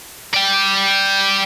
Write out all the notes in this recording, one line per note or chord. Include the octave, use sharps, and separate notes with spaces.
D5 G5